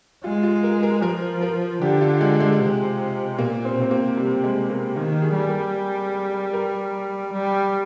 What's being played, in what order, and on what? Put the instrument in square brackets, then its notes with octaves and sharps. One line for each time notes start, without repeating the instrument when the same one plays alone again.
[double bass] G#3 [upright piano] F4
[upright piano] F4
A#4
A#4
[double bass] F3 [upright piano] A#4
[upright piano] A#4
[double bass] D3 [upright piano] G4
[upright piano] F4
G#3
G#3
[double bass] C3
[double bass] A#2 [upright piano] A#3
[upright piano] C4
[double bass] C3 [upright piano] C4
[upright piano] A#3
G3
G#3
A#3
[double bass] D#3 [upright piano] A#3
[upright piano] G#4
[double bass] G3 [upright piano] G#4
[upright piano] A#4
A#4
[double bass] G3